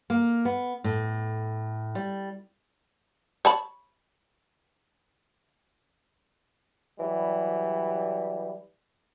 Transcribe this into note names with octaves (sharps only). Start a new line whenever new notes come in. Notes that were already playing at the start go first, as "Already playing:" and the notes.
A#3
B3
A2
G3
C#5 A5 B5
E3 F#3 G3